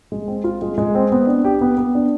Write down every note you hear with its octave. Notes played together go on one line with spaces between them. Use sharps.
G#3
C4
F4
G#3
G#3
C4
B3
D4
G4
B3
B3
D4